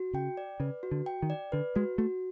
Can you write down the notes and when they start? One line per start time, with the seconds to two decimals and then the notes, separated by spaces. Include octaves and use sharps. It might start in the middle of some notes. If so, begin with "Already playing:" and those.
Already playing: F#4
0.13 C#3 G5
0.37 D5
0.60 C#3 B4
0.83 F#4
0.91 D3
1.06 G5
1.22 D#3
1.30 D5
1.52 D3 B4
1.76 G#3 F#4
1.98 A3 F#4